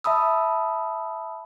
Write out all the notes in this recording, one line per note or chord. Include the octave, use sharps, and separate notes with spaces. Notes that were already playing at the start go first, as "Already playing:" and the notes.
E5 A5 B5 D#6 E6